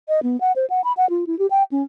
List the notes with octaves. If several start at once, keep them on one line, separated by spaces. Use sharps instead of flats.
D#5
B3
F#5
C5
F#5
B5
F#5
F4
E4
G4
G5
C#4